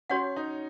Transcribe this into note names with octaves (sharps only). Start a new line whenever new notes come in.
C#4 F#4 C#5 F#5
D#4